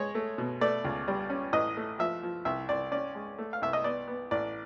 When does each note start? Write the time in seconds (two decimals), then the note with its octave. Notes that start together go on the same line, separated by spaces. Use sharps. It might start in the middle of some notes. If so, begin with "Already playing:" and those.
Already playing: G#3 C#5
0.15 A3
0.38 B2
0.61 A3 D5
0.85 C#2
1.08 G3
1.30 C#4
1.53 A1 D#5
1.77 A3
1.99 F3 E5
2.23 F3
2.45 C2 E5
2.69 C2 D5
2.92 C#4 D5
3.15 G#3
3.38 A3
3.53 F5
3.62 C2 E5
3.73 D#5
3.84 B3 D5
4.08 B3
4.31 A1 D5